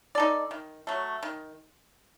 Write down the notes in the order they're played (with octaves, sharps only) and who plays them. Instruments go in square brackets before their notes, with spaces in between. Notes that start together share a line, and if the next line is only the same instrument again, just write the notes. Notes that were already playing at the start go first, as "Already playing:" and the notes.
[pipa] D#4 A4 D5
D#3
F#3 A3
D#3